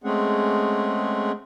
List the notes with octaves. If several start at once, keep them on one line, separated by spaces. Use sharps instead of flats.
G#3 A3 C4 C#4 G#4 F#5